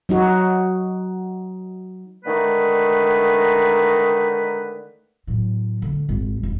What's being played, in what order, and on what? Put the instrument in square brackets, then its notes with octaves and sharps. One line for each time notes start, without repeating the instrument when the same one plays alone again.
[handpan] F#3 D#4 F#4
[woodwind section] D3 D#3 G#3 A3 D#4 B4
[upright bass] A2 F#3
D3 A3
G#1 F2
F1